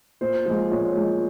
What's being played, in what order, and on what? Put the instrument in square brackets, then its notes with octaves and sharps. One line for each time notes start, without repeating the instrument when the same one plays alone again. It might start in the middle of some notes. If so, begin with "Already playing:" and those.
[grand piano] A#2 C5
F3 G#3
A#2 C#5
F3 G#3